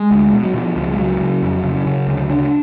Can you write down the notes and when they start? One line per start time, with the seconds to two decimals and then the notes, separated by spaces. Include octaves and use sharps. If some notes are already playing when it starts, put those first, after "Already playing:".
Already playing: G#3
0.11 D2
0.33 B2
0.44 F#3
0.54 B2 F3
0.76 C#2 F3
0.90 G#3
0.98 C#3 F#3
1.20 C#3
1.43 F2
1.64 C#3
1.86 C#3
2.07 D2
2.29 C#3 D4